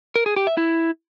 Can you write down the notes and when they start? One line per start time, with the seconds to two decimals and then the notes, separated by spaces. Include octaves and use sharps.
0.16 A#4
0.26 G#4
0.36 G4
0.47 E5
0.57 E4